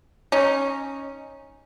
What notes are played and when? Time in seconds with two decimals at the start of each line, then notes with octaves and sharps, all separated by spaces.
0.32 C#4 D#4